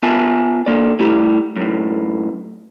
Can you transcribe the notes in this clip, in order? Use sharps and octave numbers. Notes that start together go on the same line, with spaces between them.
B3 F4 E5 G#5 A5
D3 A#3 D5
G3 A3 E4 G4
F#2 A2